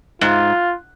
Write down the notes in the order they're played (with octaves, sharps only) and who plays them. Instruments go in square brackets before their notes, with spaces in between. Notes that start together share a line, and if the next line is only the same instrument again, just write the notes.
[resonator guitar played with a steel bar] G#2 [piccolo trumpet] F4